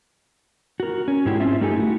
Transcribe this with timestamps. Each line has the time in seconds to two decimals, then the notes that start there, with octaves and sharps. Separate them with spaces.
0.80 F#4 A#4
1.08 C#4
1.25 G#2 G#3 E4 G4
1.40 C4 C#4 F4 E5
1.61 G2 A3 D#4 G4 A4 G#5
1.76 E4 F#4